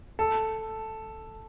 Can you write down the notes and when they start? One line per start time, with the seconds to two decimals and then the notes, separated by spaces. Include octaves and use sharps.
0.19 A4